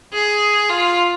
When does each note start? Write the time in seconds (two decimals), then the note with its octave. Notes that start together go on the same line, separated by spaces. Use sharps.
0.13 G#4
0.69 F4